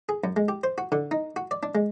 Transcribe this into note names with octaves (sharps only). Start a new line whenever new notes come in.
G#4
F#2
G#3
G4
C5
F#4
D3
D#4
F#4
D5
D4
G#3